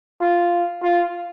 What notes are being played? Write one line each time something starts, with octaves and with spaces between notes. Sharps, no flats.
F4
F4